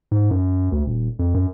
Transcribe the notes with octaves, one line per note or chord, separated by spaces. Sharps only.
G#2
F#2
D2
D#1
F2
F#2